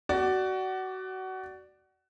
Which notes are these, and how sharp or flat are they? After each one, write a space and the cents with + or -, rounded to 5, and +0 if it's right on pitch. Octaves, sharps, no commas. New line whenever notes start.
F#4 +25 D5 +0